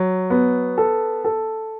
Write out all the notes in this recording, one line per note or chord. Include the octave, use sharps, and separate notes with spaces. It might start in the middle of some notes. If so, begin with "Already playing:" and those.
Already playing: F#3
B3
A4
A4